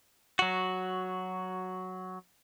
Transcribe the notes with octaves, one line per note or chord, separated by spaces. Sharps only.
F#3 F#4